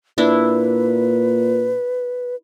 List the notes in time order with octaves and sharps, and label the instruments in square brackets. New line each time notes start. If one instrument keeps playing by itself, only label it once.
[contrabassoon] A#2 [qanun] D4 E4 [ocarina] B4